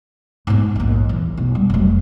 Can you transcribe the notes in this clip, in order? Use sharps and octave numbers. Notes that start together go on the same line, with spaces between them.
G#2 B3
A#1 D#2
E2
B1
G3
F1 F#3